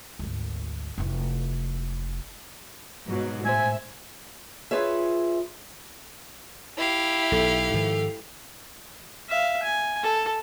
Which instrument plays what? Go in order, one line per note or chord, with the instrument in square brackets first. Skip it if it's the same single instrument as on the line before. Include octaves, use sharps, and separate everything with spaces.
[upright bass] G#1 D2
F1 E3
[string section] G#2 B2 F#3
[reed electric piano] A2 C5 [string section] E5 [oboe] G#5
[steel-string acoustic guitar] F4 G#4 B4 C#5 E5
[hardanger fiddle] E4 [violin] G4 F5
[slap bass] B1 [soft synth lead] A4
[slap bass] G#2 D#3 F3
[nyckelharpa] E5 F5
G#5
A4